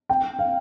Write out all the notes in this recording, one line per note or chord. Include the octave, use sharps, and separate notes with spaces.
G5
F5